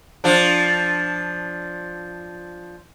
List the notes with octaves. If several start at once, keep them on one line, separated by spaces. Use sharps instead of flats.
F3 D4